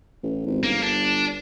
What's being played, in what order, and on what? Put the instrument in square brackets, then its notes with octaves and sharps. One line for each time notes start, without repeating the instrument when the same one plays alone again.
[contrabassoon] A1
G#1
[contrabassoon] G1 [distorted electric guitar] A#3
[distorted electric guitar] D4